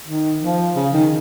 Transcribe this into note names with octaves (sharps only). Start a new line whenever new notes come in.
D#3
F3
C#3
D#3